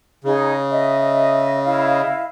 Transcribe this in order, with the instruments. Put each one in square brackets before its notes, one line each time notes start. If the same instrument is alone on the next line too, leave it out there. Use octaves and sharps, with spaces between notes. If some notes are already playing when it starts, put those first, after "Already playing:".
[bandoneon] C#3 [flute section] D#4 G#4
[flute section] D#5 E5
E4 D#5 F5